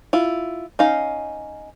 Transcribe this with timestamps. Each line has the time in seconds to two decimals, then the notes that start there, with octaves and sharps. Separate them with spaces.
0.13 E4 F4
0.79 C#4 D#4 F5